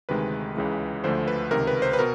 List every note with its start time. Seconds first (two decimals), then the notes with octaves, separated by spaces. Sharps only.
0.09 D2 C3 D#3 G#3 B4
0.56 C#2 C#3 E3 G#3
1.04 D2 D3 F3 A3 C5
1.28 B4
1.51 C#2 C3 D#3 A#4
1.67 B4
1.82 C5
1.93 B4
1.99 B2 A#4